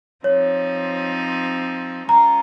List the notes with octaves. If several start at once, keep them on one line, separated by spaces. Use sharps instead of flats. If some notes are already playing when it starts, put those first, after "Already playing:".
F3 C4 D#4 C#5
G#3 C#4 F4 A#5